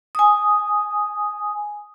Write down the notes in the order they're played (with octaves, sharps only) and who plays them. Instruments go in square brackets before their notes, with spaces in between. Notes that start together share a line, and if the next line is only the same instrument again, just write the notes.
[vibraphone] G#5 D#6